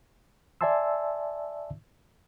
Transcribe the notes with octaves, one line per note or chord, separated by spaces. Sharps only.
D5 E5 G#5 A5 C6 E6